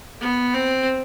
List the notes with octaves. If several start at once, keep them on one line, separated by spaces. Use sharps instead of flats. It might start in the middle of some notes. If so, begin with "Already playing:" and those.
B3
C4